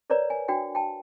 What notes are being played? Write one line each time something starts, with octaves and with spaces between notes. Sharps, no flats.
A#4 B4 C#5 D5 A#5
G#5
D4 F#4 G5
G5 A5